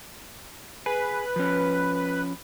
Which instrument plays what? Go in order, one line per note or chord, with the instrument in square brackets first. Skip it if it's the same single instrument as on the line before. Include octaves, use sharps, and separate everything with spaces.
[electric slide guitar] G#4 [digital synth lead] B4
[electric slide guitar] F3 C#4